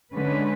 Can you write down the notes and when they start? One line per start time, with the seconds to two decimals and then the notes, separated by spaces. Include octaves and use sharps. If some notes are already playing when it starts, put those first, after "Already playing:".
0.14 D3 G#3 C#4 B4